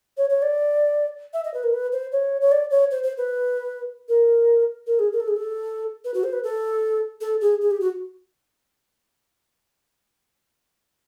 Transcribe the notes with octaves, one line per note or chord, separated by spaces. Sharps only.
C#5
C#5
D5
E5
D#5
B4
A#4
B4
C5
C#5
C#5
D5
C#5
C5
C5
B4
A#4
A#4
G#4
A#4
A4
G#4
A4
B4
F#4
C5
B4
A4
A4
G#4
G#4
G4
F#4